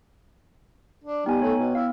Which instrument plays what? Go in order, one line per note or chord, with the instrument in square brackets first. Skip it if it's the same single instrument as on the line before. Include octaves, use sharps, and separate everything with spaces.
[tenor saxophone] D4
[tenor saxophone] G3 [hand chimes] B3 G5 [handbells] D#4 G#5
[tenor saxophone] A3 [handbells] C#5
[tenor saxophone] B2
[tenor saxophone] E4 [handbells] F5